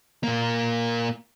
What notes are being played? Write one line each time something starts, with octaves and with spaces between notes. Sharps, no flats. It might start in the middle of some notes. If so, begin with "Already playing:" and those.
A#2 A#3